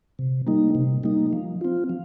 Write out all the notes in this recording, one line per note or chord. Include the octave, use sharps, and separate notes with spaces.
C3
G3 A#3 D#4
C3
G3 A#3 D#4
F3
C4 F4
F3